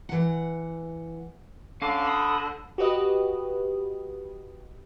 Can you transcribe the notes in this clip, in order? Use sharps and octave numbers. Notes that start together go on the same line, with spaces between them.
E3 F#5
D3 C#4 F5 D6
B5 D#6
F#4 G4 B4 D#5